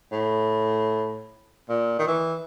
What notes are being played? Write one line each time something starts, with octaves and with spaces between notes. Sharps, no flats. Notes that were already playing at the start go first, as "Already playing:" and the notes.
A2
A#2
D#3
E3